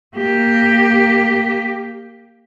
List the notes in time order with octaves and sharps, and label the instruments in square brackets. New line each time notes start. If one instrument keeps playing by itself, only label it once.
[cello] A#3 G4